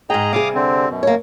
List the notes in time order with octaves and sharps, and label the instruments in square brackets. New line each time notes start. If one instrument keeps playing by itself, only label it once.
[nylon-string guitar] G#2 G5 [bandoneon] G#4 D#5 A#5
[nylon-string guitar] C3 G3 G#4 [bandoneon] F5 D6 D#6
[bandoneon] D3 C4
F#2 B2
[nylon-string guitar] A#3 C#5